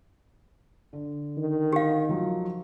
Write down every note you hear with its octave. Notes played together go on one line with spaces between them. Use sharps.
D3
D#3
G4 F5
F3 F#3